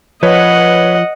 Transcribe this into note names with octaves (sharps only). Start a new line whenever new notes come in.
F3 B4 C#5 D#5 F#5